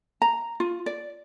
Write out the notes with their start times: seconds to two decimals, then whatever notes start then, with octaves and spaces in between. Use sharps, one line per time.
0.22 A#5
0.60 F4
0.86 D5